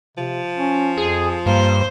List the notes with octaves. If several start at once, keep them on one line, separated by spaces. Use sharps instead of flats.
C3 F3
C#4
F2 G#4
G2 A#3 C5